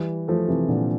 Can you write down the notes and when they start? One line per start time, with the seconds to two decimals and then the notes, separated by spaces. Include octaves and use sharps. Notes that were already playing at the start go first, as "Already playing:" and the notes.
Already playing: E3 G3
0.28 F3 A3
0.48 C3 E3
0.68 A#2 D3